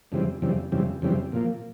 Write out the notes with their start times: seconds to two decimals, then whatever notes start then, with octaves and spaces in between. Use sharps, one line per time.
0.12 F2 C#3 E3 G3 C4
0.42 F2 C#3 E3 G3 C4
0.72 F2 C#3 E3 G3 C4
1.02 F2 C#3 E3 G3 C4
1.32 A#2 F3 A#3